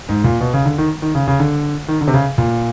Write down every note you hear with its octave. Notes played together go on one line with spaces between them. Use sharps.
G#2
A#2
B2
C#3
D3
D#3
D#3
C#3
C#3
D3
D#3
D3
C3
C#3
A#2